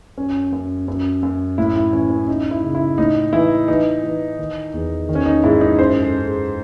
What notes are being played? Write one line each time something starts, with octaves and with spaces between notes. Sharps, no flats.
F#2 C#4
F#2
F#2
F#2
A2 E4
E4
E3 C#4
C#4
F#2 D#4
E4
C#3
E4
A2 D#4
E3 E4
E3 D#4
E3
D#3
E2
D#3
C#4
D#4
G#2 E4
D#4
F#2 C5
A4
F#2
G#4